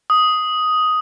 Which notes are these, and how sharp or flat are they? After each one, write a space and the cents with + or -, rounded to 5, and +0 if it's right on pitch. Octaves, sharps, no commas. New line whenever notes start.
D#6 +5